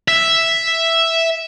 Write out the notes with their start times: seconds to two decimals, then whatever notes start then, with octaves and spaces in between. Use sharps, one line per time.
0.08 E5